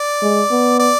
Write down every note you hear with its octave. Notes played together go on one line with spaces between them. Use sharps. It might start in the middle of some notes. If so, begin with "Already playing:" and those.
Already playing: D5
G#3
B3
D5